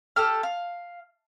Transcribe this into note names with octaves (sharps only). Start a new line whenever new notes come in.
G4 A4 F6
F5